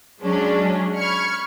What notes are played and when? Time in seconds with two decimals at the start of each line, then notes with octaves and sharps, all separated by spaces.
0.21 F#3 G#3 C#4 D4
0.97 B5 C#6 F6 G#6 C#7